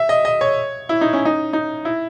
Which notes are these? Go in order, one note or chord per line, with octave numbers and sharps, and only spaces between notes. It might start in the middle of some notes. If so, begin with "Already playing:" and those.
Already playing: E5
D#5
D#5
C#5
E4
D#4
C#4
D#4
D#4
E4